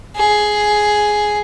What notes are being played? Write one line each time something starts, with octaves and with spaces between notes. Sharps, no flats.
G#4